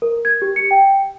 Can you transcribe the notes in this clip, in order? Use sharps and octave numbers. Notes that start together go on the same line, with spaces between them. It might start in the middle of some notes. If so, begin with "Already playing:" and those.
A#4
G#6
G4
C#7
G5